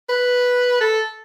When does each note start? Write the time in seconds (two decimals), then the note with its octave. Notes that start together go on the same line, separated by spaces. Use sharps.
0.09 B4
0.81 A4